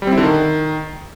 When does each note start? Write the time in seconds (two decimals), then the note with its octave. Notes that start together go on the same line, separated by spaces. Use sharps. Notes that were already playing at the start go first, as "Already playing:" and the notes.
0.02 G3
0.07 C4
0.12 E4
0.18 D3
0.23 D#3